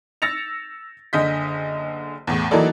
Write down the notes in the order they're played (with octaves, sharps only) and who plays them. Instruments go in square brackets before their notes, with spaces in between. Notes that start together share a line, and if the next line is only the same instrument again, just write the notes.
[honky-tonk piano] E6 A6 A#6 C#7 F7
F#1 D3 D#5 G6 B6
E2 A2
E3 F#3 A#3 D#4 A4 D5